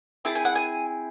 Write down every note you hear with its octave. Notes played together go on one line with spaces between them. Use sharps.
C4 E4 G#4 A5
G#5
F#5
G#5